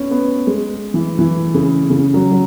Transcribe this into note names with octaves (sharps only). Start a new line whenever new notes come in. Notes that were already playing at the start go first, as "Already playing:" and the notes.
Already playing: B3 C#4
B3
G#3
E3
E3
C#3
C#3
F#3
F#3